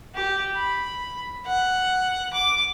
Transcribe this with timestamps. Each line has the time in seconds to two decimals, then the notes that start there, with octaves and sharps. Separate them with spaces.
0.14 G4
0.56 B5
1.47 F#5
2.34 D6